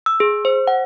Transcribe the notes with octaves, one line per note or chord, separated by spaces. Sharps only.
E6
G#4
C5
F#5